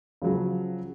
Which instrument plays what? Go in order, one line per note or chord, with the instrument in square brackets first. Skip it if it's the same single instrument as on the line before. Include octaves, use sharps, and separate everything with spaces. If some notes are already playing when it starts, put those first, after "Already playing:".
[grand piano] C#3 F3 F#3